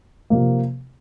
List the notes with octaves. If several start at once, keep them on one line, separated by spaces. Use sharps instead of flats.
C3 F3 A#3